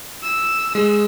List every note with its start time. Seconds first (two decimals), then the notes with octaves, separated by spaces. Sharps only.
0.23 E6
0.75 G#3